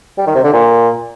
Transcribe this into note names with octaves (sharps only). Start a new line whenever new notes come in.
G3
D#3
C3
D3
A#2